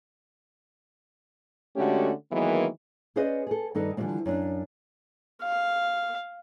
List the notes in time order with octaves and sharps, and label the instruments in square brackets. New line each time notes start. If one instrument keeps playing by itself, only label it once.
[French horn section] D3 G#3 A3 C#4 F#4 G4
D#3 E3 F#3 G#3 A#3 B3
[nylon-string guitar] C#4 G#4 B4 C5 D5 D#5
G#4 A4
G2 D#3 D#4 A4 B4 D5
D3 E3 F3 G3 G#3 C4
F#2 D4
[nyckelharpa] F5